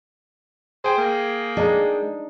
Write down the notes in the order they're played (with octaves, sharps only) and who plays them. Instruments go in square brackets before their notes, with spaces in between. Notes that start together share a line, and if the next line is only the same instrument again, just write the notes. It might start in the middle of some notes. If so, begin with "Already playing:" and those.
[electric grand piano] G#4 G5 [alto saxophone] C5
[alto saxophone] A#3
[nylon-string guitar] G#3 [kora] D4 D#4